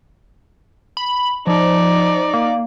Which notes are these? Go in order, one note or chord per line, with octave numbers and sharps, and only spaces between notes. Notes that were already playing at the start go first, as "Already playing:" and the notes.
B5
F3 D#4 D5
A#3